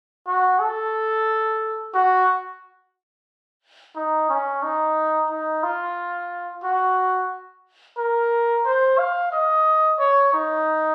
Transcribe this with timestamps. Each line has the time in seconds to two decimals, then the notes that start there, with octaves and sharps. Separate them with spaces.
0.27 F#4
0.59 A4
1.94 F#4
3.96 D#4
4.29 C#4
4.63 D#4
5.30 D#4
5.63 F4
6.63 F#4
7.98 A#4
8.66 C5
8.98 F5
9.32 D#5
9.99 C#5
10.33 D#4